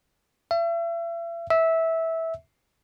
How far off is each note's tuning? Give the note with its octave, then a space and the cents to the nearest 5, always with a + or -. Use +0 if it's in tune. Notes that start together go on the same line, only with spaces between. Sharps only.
E5 +40
E5 -15